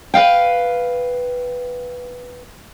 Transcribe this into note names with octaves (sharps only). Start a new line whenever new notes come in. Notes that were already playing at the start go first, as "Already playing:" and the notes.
B4 D#5 F5 G5